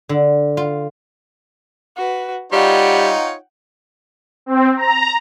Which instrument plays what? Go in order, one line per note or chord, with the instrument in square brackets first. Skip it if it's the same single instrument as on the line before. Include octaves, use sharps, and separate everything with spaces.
[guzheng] D3
F4
[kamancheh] F#4 B4
[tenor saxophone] G3 [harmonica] D#4 F4 C#5 [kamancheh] F#5 G5
[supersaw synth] C4
A#5